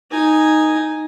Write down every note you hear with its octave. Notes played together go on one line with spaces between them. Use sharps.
D#4 G#5